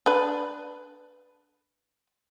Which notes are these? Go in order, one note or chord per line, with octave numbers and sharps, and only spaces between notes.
D4 B4